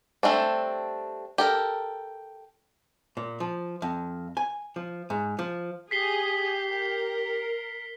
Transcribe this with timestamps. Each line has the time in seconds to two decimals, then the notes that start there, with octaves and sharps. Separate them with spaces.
0.23 G3 A3 C4 D4
1.38 G4 A4 A#4
3.17 A#2
3.40 F3
3.82 F2
4.37 G#5
4.76 F3
5.10 G#2
5.39 F3
5.91 G4 G#4 B6 C7 G7
6.70 A#4